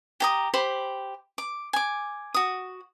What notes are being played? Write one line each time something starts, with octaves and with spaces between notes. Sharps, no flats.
G4 A#5 D#6
G4 C5 B5
D6
G#5 D6
F#4 D#6